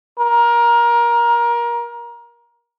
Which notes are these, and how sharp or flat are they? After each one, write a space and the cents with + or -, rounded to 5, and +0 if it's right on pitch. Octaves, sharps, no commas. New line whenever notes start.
A#4 +20